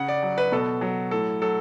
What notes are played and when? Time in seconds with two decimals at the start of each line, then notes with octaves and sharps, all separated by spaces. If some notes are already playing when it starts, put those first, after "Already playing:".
Already playing: C#3 F#5
0.08 D5
0.23 F#3
0.38 B4
0.52 B2 A4
0.81 F#3
1.11 A2 A4
1.42 F#3 A4